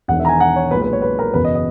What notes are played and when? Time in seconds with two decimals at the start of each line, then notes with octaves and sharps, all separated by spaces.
0.08 E1 F#5
0.11 E2 D#3
0.20 E5
0.25 A#5
0.29 G#5
0.40 F#5
0.56 C#5
0.71 B1 A#2 G#3 B4
0.82 B4
0.93 C#5
1.02 B4
1.19 A#4
1.34 F#1 E2 B2 B4
1.44 D#5
1.55 D#5